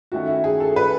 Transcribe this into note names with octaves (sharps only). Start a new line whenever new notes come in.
D#3 A3 C#4 F#4
E4
G#4
A4
B4